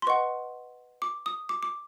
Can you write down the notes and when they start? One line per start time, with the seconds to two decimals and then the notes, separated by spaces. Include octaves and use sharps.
0.02 C6
0.07 B4 D#5 F#5 C#6
1.02 D6
1.26 D#6
1.49 D6
1.63 D6